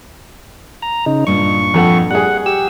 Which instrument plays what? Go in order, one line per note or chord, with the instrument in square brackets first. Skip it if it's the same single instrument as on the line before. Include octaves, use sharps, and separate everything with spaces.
[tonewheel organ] A#5
C#3 D#4
[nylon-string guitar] G2 A#2 [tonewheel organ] C#6
[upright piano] F2 A4 F#5
[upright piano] G3 G#4 [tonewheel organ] F#5
[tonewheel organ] G4 E6